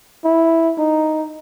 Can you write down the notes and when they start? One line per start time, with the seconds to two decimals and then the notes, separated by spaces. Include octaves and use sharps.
0.24 E4
0.78 D#4